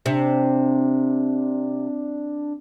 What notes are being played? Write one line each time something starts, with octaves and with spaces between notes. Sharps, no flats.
C3 D4